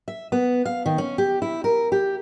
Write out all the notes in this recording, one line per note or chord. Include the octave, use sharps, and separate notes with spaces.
E5
B3
F5
D#3
C#4
G4
E4
A#4
G4